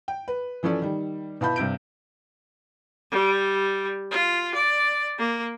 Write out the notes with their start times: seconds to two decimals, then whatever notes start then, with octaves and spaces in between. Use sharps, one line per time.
0.08 G5
0.28 B4
0.63 E3 F3 C#4 A4 D5
0.82 D#3 G3
1.41 B2 E4 F5 A5 B5 G6
1.56 G2 C3 G6 D7
3.11 G3
4.11 F4
4.55 D5
5.18 A#3